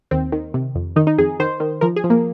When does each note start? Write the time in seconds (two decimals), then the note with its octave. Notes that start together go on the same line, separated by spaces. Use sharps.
0.11 D#2 C4
0.32 D#3
0.54 C3
0.75 F2
0.96 D#3 D#4
1.07 D#4
1.18 F2 G#4
1.40 D#3 C5
1.60 D#3
1.81 F3 A#4
1.96 G#4
2.04 F3
2.10 A#3